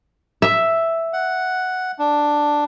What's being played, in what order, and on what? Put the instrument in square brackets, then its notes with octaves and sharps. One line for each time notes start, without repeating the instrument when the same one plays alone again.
[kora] E5
[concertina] F#5
D4